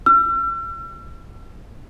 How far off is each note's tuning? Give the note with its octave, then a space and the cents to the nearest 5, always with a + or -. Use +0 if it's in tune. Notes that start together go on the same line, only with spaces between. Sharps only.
E6 +45